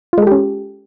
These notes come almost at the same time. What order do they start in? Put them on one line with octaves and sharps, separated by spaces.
F4 G#3 A4 G4 C#4